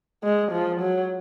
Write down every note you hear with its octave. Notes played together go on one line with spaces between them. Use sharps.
G#3
F3
F#3